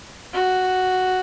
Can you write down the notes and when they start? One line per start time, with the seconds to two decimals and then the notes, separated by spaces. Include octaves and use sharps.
0.33 F#4